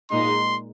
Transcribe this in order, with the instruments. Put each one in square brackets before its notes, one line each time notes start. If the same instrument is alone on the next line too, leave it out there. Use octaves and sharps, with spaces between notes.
[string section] A#2 G#3 D#4 [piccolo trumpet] C6